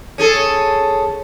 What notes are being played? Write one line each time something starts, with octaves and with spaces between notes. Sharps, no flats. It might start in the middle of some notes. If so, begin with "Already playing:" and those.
C#4 G#4 A4